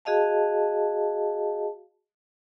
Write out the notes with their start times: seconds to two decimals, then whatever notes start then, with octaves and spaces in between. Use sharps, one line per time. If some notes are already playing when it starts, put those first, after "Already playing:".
0.05 F#4 G#4 D#5 F5 A5